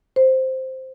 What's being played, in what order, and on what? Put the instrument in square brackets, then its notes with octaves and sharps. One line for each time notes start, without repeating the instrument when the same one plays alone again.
[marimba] C5